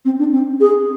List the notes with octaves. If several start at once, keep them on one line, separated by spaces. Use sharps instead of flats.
C4
D4
C4
G#4